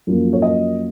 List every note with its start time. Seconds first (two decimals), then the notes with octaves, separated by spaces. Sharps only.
0.07 F#2 F3 A#3
0.33 C#5
0.42 D#5